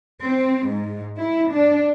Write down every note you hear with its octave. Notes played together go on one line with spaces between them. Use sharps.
C4
G#2
E4
D4